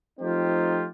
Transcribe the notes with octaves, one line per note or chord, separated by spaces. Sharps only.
F3 A3 C4 D#4 F4 G4